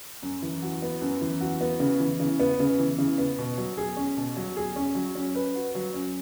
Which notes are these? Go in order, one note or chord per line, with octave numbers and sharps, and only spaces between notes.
F#2
E3
F#4
B3
F#2
E3
F#4
B3
C#3
E3
C#3
B3
C#3
E3
C#3
B3
B2
F#3
G#4
C#4
B2
F#3
G#4
C#4
F#3
C#4
B4
F#4
F#3
C#4